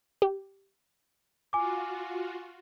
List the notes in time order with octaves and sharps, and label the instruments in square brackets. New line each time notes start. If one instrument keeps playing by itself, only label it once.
[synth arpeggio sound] G4
[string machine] F4 F#4 [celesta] G#5 D6